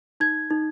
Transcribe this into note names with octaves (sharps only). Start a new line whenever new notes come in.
D#4 G#6
D#4